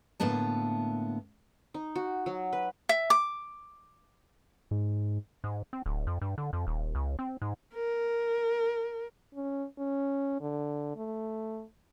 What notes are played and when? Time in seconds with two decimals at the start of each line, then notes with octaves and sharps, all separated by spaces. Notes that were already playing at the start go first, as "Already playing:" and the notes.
0.20 A2 D3 A#3 B3 A5
1.74 D#4
1.95 F#4
2.26 F#3
2.53 B4
2.89 E5
3.10 D6
4.71 G#2
5.44 G#2
5.73 C4
5.86 D1
6.07 F2
6.22 G2
6.38 D3
6.53 F2
6.67 D#1
6.95 C#2
7.19 C4
7.42 G#2
7.75 A#4
9.35 C#4
9.79 C#4
10.41 D3
10.97 A3